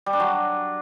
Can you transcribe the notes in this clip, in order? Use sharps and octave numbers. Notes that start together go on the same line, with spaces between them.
G3
D4
F#3